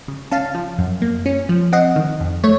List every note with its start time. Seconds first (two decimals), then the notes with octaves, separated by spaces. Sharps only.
0.08 C#3
0.31 C#4 F5 A5
0.55 F3
0.79 F#2
1.02 A#3
1.26 C#4
1.49 F3
1.73 C4 D#5 F#5
1.96 D#3
2.20 F2
2.44 A3 C#5